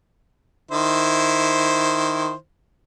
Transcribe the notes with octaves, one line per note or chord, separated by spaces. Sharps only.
D#3 E4 C5